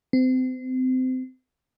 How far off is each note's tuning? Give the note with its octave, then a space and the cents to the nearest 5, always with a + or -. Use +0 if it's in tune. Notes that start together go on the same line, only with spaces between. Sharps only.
C4 -30